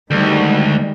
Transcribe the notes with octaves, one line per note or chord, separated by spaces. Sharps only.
D2 D#3 G3 G#3